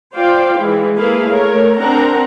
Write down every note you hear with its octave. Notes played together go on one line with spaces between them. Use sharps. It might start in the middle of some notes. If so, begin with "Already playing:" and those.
F4 C5 D5 F5 G5
E3 G#3 E4
A#3 E4 G#4 A4 B4 F5
A3 A#4 C#5
C4 D4 A#4 F#5 A#5